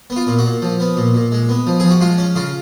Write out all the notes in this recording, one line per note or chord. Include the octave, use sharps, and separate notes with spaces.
B3
F4
A#2
F#4
A#2
F3
B3
A#2
A#2
G#3
B3
F3
F3 G#4
F#4
G#3 F4
C#4
C#3 F4